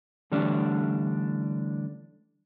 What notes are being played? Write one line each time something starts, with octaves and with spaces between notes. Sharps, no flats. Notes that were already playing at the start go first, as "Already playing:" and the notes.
D3 E3 G3 A3 C#4 D4